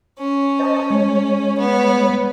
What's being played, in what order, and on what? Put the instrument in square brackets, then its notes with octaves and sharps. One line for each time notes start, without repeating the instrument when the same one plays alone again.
[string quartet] C#4
[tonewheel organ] C5 D#5 A5
G#3 C#5
[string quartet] B3